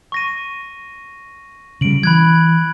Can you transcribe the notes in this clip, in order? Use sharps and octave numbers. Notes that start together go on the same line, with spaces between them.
C#6 A#6 D#7
C#3 G3 D7 F#7
E3 B5 F#6 G#6